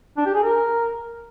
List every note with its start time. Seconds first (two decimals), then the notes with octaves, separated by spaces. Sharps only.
0.17 D4
0.26 G4
0.35 G#4
0.43 A#4